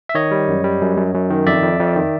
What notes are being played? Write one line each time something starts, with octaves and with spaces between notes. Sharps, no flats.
E5
D#3 C#5 D#5
G3
F#2
G3
F#2
F#2
F#2
D#3
F2 D5 E5
F2
F2
D#3